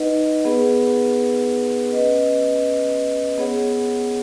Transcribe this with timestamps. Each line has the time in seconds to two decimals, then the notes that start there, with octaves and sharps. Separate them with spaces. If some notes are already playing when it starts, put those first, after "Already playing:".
Already playing: D#4 B4 D#5 F#5
0.44 B3 G#4 B4 F#5
1.91 C#4 B4 D#5
3.38 B3 G#4 C#5 F#5